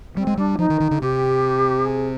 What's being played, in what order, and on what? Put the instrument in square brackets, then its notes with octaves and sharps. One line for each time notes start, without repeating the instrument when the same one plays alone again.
[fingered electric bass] G3 [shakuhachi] C4
[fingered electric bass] G#3
[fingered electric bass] G3 [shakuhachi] D4
[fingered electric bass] F3 [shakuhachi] D#4
[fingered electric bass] D#3
D#3
D3
[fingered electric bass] C3 [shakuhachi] G4
[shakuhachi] G#4